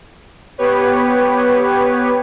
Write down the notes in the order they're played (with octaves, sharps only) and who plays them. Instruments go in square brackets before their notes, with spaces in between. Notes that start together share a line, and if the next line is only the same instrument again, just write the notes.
[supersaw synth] B3 G4 B4 C#5